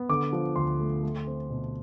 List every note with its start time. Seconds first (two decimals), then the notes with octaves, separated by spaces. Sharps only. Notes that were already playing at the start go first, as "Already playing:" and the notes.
Already playing: B3
0.09 D3 D6
0.33 F3
0.56 D2 C6
0.80 A3
1.03 A3
1.27 C4
1.50 B2